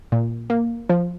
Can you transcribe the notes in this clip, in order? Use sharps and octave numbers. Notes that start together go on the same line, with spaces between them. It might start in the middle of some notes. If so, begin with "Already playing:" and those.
A#2
A#3
F3